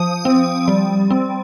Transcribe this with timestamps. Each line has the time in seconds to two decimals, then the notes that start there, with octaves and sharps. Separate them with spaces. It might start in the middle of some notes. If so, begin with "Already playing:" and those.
Already playing: F3 D#6
0.25 C4
0.68 G3
1.10 C4